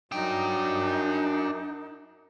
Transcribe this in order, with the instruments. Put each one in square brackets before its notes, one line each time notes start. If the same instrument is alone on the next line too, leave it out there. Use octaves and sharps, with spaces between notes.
[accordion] F#2 [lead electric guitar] D4 G5 [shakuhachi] D#4